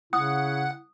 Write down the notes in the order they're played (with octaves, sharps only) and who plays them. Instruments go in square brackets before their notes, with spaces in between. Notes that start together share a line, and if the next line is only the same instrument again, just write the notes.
[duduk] C#3 [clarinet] E4 [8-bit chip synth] F#5 [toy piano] D#6